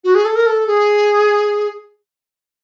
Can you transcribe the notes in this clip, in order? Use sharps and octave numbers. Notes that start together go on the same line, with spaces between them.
F#4
G#4
A4
A#4
A4
G#4